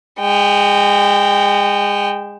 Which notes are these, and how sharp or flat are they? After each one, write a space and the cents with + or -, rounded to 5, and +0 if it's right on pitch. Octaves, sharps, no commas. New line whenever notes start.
G#3 -25 G5 +0